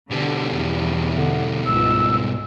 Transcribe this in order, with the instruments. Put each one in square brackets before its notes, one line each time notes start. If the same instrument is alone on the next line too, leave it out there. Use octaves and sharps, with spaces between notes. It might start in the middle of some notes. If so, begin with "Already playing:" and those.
[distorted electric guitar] B2 G3 [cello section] D3
[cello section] E2
[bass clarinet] D3
[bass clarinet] C#2 [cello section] G#2 [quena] E6